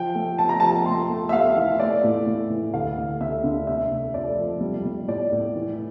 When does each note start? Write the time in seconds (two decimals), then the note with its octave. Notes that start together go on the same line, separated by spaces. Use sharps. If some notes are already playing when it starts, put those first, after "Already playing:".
Already playing: F3 G5
0.15 A3
0.38 F3 A5
0.49 A#5
0.60 F3 A5
0.86 A3 C6
1.10 A3
1.29 E5
1.33 A3 F5
1.57 E3
1.80 A3 D5
2.03 A2
2.26 A2
2.50 E3
2.74 D2 F5
2.97 D2
3.21 D2 E5
3.44 D3
3.67 C3 E5
3.91 A3
4.14 F2 D5
4.38 F3
4.61 G3
4.85 G3
5.08 A2 D5
5.32 A2
5.56 E3